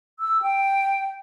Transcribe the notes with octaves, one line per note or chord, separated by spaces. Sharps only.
E6
G5